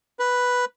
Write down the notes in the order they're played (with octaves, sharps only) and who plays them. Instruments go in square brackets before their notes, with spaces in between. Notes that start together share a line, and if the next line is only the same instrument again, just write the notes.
[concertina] B4